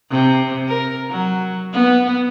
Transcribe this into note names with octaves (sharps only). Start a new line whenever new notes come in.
C3
A#4
F#3
B3